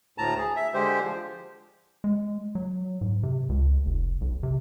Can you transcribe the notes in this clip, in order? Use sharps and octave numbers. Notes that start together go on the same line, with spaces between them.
D2 A2 A5 A#5
G#4
E5
D3 G#3 G4 C5
F3
G#3
F#3
G#2
C3
C#2
F1
B1
C3